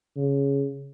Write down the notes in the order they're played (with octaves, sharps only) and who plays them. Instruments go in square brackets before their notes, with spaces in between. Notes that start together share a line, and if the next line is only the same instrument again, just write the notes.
[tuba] C#3